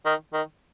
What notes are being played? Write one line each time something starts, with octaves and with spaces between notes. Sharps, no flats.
D#3
D#3